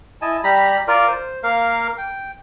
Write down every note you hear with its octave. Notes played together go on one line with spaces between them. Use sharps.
E4 D#5 G#5 A5
G3 G4 A#5 B5
F4 A#4 D5
C5
A#3 A#4 F5
G5